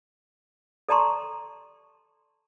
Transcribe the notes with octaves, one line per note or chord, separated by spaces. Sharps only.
A4 D5 A5 A#5 C6 C#6